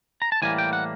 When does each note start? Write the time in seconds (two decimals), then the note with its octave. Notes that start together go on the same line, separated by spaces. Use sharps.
0.22 A#5
0.32 A5
0.42 A2 E3 G3 A#3 G#5
0.58 G5
0.73 F#5